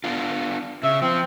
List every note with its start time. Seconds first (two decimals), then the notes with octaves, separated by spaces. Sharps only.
0.04 B3 D4 F4
0.83 C#3 E5
1.02 F3 C4